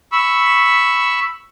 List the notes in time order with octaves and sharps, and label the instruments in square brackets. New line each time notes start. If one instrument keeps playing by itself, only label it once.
[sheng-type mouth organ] B5 C#6 E6